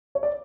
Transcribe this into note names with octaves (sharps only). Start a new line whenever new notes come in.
C#5
D5